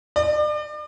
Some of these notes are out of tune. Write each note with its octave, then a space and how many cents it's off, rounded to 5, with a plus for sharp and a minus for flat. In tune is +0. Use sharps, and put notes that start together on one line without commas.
D5 +40